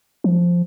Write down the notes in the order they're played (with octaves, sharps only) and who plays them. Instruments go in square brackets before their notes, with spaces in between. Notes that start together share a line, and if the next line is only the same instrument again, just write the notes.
[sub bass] F3